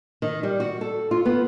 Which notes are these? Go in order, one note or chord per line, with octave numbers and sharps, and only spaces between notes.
D#3
G3
F#4
A4
F4
B3